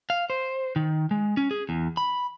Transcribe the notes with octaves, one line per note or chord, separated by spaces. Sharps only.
F5
C5
D#3
G#3
C#4
G#4
E2
B5